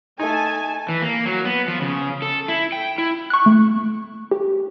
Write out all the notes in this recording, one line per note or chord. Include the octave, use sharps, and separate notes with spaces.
A3 D#4 G#5 A5
E3
A#3
F#3
B3
F3
C#3
A4
E4
G5
E4
C#6 F#6
A3
G4